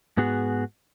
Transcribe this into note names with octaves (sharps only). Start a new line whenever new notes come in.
G#2 B3 F#4 G#4